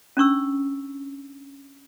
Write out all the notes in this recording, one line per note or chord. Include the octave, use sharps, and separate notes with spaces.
C#4 D4 C#6 E6